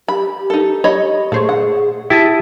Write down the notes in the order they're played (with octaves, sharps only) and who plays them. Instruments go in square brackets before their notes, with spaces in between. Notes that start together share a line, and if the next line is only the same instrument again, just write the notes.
[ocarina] G4 [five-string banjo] B5
[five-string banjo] D#4 A4
C#5 D#5 B5
[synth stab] A#2 C5 C#5 [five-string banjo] A3 [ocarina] G#4
[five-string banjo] F#5
[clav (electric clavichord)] E4 [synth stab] G4 A5 D#6